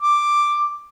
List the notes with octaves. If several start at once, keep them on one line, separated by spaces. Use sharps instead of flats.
D6